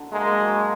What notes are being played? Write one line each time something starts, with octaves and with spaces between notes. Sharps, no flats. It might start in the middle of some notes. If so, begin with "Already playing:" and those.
Already playing: D3 F#3 D4
G#3 A#3
F#3